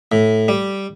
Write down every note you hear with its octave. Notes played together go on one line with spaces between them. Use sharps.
A2
G3